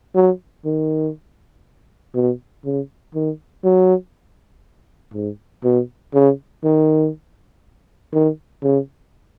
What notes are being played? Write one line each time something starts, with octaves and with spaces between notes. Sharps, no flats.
F#3
D#3
B2
C#3
D#3
F#3
G#2
B2
C#3
D#3
D#3
C#3